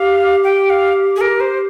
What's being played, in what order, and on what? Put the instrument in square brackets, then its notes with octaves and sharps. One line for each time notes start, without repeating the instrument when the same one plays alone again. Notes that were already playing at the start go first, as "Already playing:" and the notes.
Already playing: [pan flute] G4 [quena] F5
[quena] G5
F5
G#4
A#4
C5